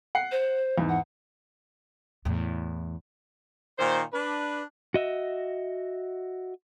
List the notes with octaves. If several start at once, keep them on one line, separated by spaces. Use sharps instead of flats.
F#5 C7
C5
E2 G#2
F#5
E2 A2
A#2 D#3 C5
D4 B4
F#4 D#5 E5